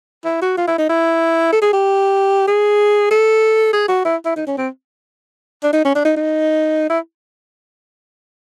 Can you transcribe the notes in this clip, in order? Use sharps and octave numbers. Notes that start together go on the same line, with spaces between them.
E4
F#4
F4
E4
D#4
E4
A4
G#4
G4
G#4
A4
G#4
F#4
E4
E4
D#4
C#4
C4
D4
D#4
C#4
D4
D#4
D#4
E4